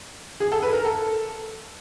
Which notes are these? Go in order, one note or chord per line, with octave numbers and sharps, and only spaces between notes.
G#4
A4
B4
A#4
A4